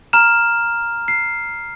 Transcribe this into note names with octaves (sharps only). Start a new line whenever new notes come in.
A#5 F6 E7
C7